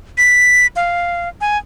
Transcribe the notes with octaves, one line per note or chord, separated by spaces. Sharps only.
B6
F5
G#5